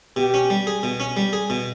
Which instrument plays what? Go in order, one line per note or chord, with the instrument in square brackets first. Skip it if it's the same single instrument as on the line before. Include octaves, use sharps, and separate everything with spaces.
[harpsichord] B2 [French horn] G4
[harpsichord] C#4
G3
G#4
B2
C#4
G3
G#4
B2